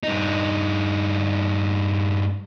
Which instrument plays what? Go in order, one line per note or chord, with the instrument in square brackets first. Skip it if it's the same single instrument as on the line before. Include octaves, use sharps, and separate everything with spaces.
[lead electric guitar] G2 D#4